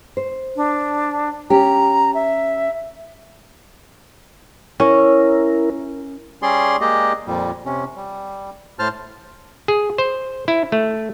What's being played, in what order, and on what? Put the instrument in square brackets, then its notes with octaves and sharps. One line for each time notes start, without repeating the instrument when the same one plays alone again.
[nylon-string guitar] C5
[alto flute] D4
[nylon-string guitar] C#4 G4 [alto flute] A#5
[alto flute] E5
[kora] C#4 [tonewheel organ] E4 A#4
[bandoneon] G3 C#4 G#4 D5 C6
G#3 A#3 G4 D5 D#5
F2 A#2 G3
C3 C#4
G3
A2 C5 A5 F6
[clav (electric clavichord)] G#4
C5
E4
A3